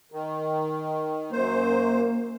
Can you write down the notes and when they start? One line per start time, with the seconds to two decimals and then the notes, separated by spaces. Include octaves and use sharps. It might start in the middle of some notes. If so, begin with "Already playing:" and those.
0.12 D#3
1.32 F#2 A#3 C5